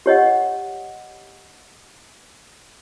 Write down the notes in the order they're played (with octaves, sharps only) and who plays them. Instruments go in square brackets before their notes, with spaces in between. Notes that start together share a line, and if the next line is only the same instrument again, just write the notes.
[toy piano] G4 C#5 D#5 F#5